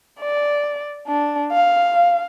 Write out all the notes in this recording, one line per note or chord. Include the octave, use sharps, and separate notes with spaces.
D5
D4
F5